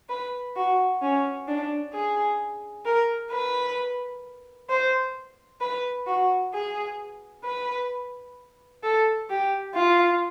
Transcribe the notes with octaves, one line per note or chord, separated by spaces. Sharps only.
B4
F#4
C#4
D4
G#4
A#4
B4
C5
B4
F#4
G#4
B4
A4
G4
F4